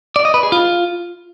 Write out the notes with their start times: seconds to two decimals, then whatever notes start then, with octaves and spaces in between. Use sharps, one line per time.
0.16 D5
0.25 D#5
0.34 B4
0.43 G#4
0.52 F4